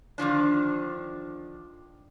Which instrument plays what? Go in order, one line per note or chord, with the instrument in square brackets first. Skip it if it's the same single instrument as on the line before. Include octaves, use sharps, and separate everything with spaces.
[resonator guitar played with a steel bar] D3 D#3 F3 D4